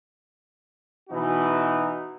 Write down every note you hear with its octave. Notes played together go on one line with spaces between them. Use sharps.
B2 E3 D#4 F#4